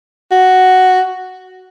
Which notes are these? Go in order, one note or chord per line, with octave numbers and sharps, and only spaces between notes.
F#4